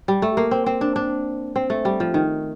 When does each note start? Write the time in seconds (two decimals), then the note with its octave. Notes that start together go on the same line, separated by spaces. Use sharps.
0.08 G3
0.22 A3
0.37 A#3
0.51 C4
0.66 C4
0.81 D4
0.96 D4
1.56 C4
1.70 A3
1.85 G3
2.00 F3
2.14 D#3